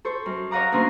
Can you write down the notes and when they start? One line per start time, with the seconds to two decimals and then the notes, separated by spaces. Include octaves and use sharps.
0.05 A4 C5 C#6
0.26 F#2
0.51 C#5 D#5 F5 F#5 A#5 D6
0.72 D2 D3 A#3 C#4 A#4 C6